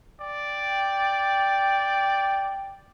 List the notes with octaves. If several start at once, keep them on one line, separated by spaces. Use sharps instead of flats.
D5 G5